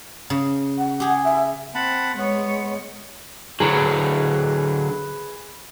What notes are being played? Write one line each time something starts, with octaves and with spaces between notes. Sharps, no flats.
C#3
F#5
G4 G#4
E5
C4 F#5 A5 B5
G#3 B3 C#5
D3 F#3 G#4 B4